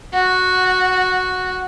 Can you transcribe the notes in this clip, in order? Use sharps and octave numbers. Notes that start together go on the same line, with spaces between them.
F#4